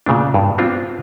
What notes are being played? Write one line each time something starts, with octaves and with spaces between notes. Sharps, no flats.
A#2 C#3 A3 D4
G2
B3 C4 D4 F4